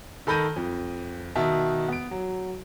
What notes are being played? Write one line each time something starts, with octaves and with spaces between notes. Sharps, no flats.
D#3 A4 B5 G6 A#6 D#7
F2
B2 D#3 E5 A5
B3 D7
F#3